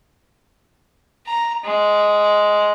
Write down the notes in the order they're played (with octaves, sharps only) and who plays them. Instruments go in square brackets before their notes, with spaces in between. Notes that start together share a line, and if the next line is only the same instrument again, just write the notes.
[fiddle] A#5
G#3